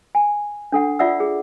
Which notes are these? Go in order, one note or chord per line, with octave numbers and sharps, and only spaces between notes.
G#5
D4 A4 F#5
F4 D5 E5 F#5 D#6 E6
G#4